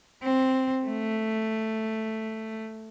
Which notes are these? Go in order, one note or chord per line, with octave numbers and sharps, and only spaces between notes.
C4
A3